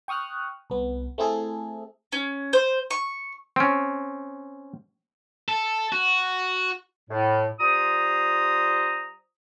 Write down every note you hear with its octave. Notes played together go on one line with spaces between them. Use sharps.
G5 C#6 D#6 F6 F#6
C2 B3
A3 C4 E4 G#4 A4
C#4
C5
C#6
C4 C#4
A4
F#4
A2
G3 F4 C5 A#5 D#6